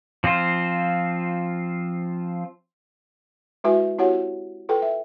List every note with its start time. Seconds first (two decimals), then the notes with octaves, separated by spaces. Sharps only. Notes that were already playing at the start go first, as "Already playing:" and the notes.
0.24 F3 C4 F4 C5
3.64 G#3 E4 F#4 B4 E5 G#5
3.98 C4 E4 F#4 G4 C#5 F#5
4.69 F4 A4 B4 G5
4.82 E5